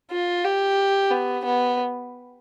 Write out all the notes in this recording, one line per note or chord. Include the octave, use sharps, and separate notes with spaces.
F4
G4
B3
B3